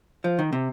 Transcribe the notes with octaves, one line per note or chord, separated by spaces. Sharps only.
F3
D#3
C3